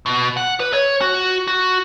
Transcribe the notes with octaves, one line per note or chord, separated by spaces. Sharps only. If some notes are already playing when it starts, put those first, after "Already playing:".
B2
F#5
B4
C#5
F#4
F#4